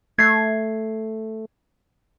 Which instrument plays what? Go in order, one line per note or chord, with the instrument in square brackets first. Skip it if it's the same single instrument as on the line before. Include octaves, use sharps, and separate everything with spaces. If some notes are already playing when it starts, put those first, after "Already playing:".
[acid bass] A3 [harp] G#6 C7